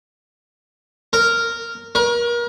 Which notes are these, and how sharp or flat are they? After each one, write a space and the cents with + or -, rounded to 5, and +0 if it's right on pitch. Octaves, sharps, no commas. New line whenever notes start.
A#4 -10
A#4 +35